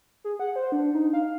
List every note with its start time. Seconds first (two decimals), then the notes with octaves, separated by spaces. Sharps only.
0.24 G#4
0.40 F#5
0.56 C5
0.72 D4
0.95 D#4
1.13 F5